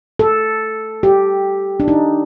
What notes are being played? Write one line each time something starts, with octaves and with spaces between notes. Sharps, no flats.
A4
G4
D4
D#4